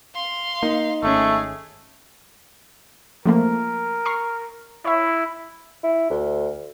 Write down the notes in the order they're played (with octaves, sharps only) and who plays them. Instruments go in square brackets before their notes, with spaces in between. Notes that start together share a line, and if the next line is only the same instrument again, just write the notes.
[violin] F5 C6
[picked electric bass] A#3 [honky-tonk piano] D#4
[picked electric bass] G#1 C#4 [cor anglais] A3 [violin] G#4
[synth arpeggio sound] F3 A3 A#3 [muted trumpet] A#4
[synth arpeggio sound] A#5 C#6 C7
[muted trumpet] E4 [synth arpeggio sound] C#5 E5
[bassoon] E4
D2